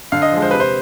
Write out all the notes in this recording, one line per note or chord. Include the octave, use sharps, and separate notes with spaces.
D3 F5
D#5
F3 G#3
C5
C3 B4
C5